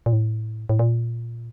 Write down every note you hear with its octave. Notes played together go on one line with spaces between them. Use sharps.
A#2
A2
A2
A#2